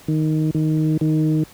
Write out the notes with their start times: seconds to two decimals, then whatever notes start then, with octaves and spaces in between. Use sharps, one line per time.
0.08 D#3
0.55 D#3
1.01 D#3